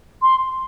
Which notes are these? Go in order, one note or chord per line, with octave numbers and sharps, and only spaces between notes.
C6